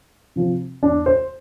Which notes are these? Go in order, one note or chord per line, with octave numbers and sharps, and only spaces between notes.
C3 F3 C4
E2 D4
C5